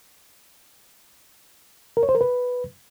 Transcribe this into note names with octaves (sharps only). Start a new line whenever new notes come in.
A#4
C#5
C5
A#4
B4